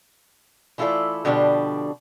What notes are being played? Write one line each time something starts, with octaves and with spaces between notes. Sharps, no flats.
E3 A3 E4 F4 A4 D5
B2 D3 F3 G3 D4